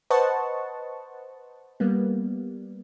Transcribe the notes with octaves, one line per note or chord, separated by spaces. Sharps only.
B4 C5 D#5 F#5 A5 C#6
G3 A#3 B3